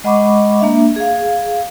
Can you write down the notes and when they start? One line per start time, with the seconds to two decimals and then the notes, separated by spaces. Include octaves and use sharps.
0.04 G#3 D#5 F#5 B5 C#6 D6
0.60 A#3 D4 E5
0.96 G#4 F5